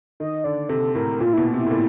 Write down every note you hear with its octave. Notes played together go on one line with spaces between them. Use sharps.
D#3 D#5
D3 D5
C3 A4
A2 A#4
A#2 F4
B2 E4
C3 E4
A2
A#2